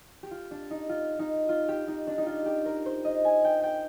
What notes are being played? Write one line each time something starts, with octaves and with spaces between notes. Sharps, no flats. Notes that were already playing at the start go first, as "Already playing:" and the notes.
G4
F4
D4
D#4
F4
D#4
F4
G4
D#4
D4
D#4
F4
G4
A#4
C5
D#5
G#5
G5
G5